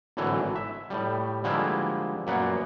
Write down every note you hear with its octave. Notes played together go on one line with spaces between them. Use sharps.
G#1 A2 D3 E3 F#3
E5
A2 G3
D3 F3 G3 G#3 A#3 E4
F#2 A#2 A#3 B3 F#5